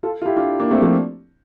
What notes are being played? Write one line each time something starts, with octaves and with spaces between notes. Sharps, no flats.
F4 A4
F4
E4 G4
D4 F4
A#3 D4
A3 C4
F3 A3